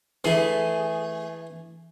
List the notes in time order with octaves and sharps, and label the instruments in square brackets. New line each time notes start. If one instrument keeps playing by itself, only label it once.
[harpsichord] E3 [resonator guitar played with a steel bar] A3 G#4